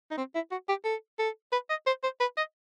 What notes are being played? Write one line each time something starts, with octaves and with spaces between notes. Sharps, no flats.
D#4
C4
E4
F#4
G4
A4
A4
B4
D#5
C5
C5
B4
D#5